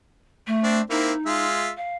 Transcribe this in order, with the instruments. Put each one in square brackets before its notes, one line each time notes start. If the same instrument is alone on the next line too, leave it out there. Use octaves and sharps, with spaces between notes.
[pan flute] A3
[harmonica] C4 D4
[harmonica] A#3 C4 E4 [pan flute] D#4
[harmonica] G#3 F4 E5
[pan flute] F5